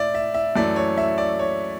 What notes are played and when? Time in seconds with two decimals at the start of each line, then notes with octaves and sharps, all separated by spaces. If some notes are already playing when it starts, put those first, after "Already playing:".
Already playing: A2 D5 E5
0.15 E5
0.34 E5
0.56 F#2 E3 A3 D5
0.76 C#5
0.98 E5
1.18 D5
1.39 C#5